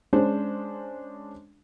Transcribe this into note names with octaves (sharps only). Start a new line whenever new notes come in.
G#3 C#4 D4 C5